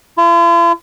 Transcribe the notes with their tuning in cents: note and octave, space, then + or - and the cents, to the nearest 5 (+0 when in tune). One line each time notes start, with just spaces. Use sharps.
F4 -45